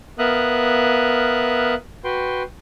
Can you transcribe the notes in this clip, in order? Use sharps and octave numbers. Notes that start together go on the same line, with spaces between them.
B3 A#4 E5 F5 D#6 F#6
F#4 B4 G5 C6